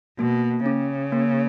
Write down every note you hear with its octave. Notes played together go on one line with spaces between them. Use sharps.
B2 A#3
C#3 C#4
A#3